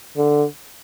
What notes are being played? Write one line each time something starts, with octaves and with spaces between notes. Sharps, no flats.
D3